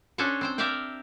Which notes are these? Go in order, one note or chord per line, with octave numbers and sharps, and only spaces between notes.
C#4 D4 A4 C5 C#5
C4 C5 G5
G4 A#4 D5 E5 F5 G5